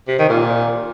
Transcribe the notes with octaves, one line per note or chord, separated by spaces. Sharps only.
C3
D#3
A#2